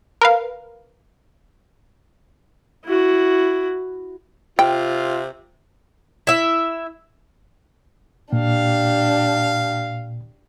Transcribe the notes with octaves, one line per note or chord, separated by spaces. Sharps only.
A#4 B4 F5
E4 F#4
C3 F4 G5
E4 E5
A#2 D4 G4 F5